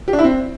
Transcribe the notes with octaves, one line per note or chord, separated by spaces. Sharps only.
G4
D4
E4
C4